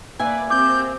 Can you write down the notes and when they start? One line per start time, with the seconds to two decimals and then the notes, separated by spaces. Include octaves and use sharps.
0.19 A#3 B4 D5 E5 G#5
0.50 C4 G4 D6 G6